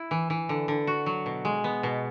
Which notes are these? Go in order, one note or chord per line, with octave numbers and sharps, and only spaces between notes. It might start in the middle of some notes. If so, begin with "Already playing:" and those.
Already playing: E4
E3
E3
D3
D3
F#4
F#3
B2
G#3
B3
B2